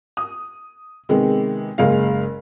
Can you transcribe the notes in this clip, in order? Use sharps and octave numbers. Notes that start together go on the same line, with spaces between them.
D#6
C3 D#3 G#3 B3
F#1 G#3 F5